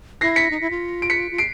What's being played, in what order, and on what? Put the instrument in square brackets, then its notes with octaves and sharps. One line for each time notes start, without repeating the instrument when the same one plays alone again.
[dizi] E4 [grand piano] A#6 C7
[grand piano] B6 C#7
[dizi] D#4
E4
F4
[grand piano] D7
B6 C#7
[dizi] F4
[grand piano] C7 D7